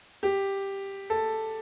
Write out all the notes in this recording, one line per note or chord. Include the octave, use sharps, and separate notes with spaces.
G4
A4